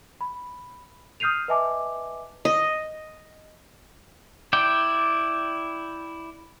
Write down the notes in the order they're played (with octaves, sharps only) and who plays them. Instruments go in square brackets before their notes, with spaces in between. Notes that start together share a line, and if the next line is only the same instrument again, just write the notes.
[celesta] B5
D#6 F6 G6 C7 D#7 F7
B4 D#5 E5 G#5 A5 D6
[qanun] D#5
[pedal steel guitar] E4 D5 G5